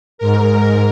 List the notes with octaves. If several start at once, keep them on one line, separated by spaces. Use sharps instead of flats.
G#2 A#4